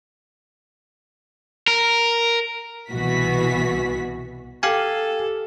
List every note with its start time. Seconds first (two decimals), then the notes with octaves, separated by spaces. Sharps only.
1.68 A#4
2.91 C2 B2 E3 F#4 B6
4.63 G4 A4 F5 G#5